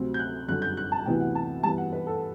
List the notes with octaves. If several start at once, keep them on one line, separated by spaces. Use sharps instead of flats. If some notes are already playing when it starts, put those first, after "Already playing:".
Already playing: D2 C3 F#3 C4
G6
F#6
G1 F#2 D3 F#6
G6
F#6
A5
D2 C3 E3 B3 E4 G5
F#5
A5
G2 E3 B3 A5
F#5
B4
A4